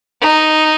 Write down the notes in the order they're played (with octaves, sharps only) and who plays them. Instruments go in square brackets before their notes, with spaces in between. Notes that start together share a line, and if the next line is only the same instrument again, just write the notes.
[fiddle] D#4